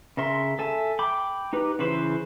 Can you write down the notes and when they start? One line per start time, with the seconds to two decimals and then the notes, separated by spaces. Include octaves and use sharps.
0.17 C#3 A#4 E5 C6
0.59 A4 E5 G#5
0.99 G5 B5 D6
1.53 D#4 G4 B4
1.79 C#3 E3 B4 C5